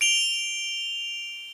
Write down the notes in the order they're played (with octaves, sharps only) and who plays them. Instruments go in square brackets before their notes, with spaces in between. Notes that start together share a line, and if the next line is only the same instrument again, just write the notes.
[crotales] D7 F7 G7